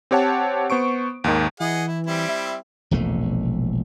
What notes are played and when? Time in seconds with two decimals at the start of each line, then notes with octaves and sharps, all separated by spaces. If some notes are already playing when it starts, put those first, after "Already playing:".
0.11 C4 G4 C#5 F#5 A5
0.70 B3 C5 C#6 D7
1.24 D#2 G#2 D#3
1.60 E3 G#4 D#5 F#5
1.88 E4
2.07 G3 C4 E4
2.29 E5
2.91 E1 A#1 C3 A3